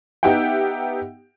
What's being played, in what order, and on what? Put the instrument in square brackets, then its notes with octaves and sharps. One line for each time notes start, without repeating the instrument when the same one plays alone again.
[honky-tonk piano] B3 D#4 G4 E5 F#5 G5